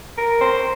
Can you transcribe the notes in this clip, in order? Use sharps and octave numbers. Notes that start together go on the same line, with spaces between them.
A#4
C5